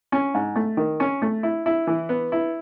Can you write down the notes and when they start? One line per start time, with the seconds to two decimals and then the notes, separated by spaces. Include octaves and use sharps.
0.12 C#4
0.34 G#2
0.56 A3
0.77 D#3
1.00 C#4
1.22 A3
1.43 E4
1.66 E4
1.87 E3
2.09 B3
2.32 E4